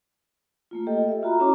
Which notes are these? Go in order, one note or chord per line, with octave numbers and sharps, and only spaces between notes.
A3 A#3 F4
G4 A4 D#5 G5
E5
F4 F#4 A#5 B5
C#4 E4 C#5 A#5 D6